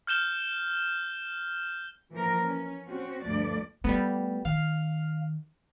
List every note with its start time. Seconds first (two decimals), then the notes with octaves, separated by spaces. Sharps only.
0.07 F6 G6 E7 G7
2.11 E3 F3 A#3 A#4
2.44 C#4
2.87 C4 C#4 F#4
3.26 D2 G2 F3 A3 D5
3.84 G3 A3 B3
4.45 D#3 F5 F6